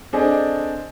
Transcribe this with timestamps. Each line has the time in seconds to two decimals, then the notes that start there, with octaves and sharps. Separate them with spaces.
0.13 C4 D4 G#4 A4 D5 D#5